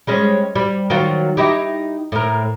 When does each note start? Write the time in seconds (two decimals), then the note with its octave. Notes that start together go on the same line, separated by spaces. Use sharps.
0.07 G3 G#3 C#4
0.55 G3
0.90 D#3 F#3 F4
1.37 D#4 E4 G4
2.12 A2 A#4